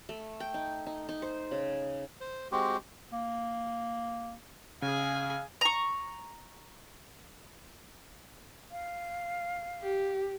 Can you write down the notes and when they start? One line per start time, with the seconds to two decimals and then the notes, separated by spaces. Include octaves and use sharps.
0.09 A3
0.40 G5
0.54 D#4
0.86 D#4
1.09 D#4
1.22 C5
1.51 C#3
2.21 C5
2.52 G#3 C4 F#4 G4
3.12 A#3
4.82 C#3 G#4 F5 G#5
5.61 A#5 C#6
8.71 F5
9.82 G4